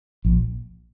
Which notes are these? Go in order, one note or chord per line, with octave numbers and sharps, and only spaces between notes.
A#1